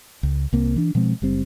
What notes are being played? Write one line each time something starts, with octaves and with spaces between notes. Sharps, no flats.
C#2
C2 A#3 C4
E3 D4
B2 F3 G#3 C4
F#1 G3 C4